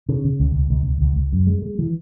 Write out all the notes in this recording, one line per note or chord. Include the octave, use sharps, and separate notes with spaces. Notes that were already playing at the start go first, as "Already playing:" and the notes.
C#3
C#3
C#2
C#2
C#2
C#2
C#2
C#2
F#2
G#3
G#3
E3